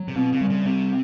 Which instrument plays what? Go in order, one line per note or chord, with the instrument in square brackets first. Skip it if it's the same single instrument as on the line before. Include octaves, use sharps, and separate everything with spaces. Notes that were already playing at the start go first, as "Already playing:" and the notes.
Already playing: [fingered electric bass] F#3
[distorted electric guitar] C3
[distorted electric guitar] B2 [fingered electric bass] C4
[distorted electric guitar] C#3
[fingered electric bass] G3
[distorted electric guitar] C#3
[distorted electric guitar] C3 [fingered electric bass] C4